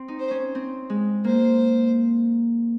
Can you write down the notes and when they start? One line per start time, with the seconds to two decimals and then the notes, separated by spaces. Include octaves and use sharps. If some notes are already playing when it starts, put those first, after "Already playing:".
Already playing: C4
0.08 D#4
0.19 C5
0.31 C#4
0.55 C4
0.90 G#3
1.24 A#3 C5